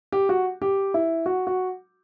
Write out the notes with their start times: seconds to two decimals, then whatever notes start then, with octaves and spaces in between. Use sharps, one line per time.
0.12 G4
0.29 F#4
0.62 G4
0.94 E4
1.26 F#4
1.47 F#4